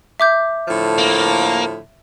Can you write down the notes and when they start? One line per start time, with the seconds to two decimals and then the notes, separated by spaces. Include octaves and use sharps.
0.20 E5 D6 G6
0.68 A2 D3 F3
0.98 A#3